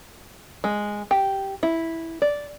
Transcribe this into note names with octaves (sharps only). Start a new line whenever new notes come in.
G#3
G4
E4
D5